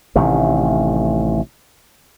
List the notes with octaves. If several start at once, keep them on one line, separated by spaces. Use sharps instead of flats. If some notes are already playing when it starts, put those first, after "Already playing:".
A1 C3 D#3 A3